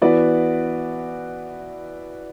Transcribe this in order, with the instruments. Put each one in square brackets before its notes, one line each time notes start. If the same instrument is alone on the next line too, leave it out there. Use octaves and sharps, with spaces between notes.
[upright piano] E3 B3 F#4 B4 D5